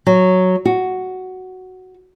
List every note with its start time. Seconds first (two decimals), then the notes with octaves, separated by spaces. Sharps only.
0.07 F#3
0.65 F#4